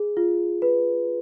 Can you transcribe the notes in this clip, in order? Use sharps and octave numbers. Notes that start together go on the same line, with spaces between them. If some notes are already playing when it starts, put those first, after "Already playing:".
Already playing: G#4
F4
B4